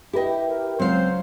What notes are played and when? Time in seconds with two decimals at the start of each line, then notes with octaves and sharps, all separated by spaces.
0.13 E4 G4 B4 D#5 G5
0.47 A#4
0.80 C#2 F#3 C4 C5 F5